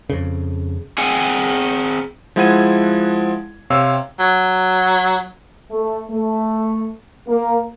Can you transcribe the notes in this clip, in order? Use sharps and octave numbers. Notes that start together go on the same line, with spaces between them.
F2 C#3
C4 G#4 F#5 G#5
F3 G#3 E4 F#5 G#6 D#7
C3 C4 C#5 F5 C6 E6
F#3
A3
A3
A#3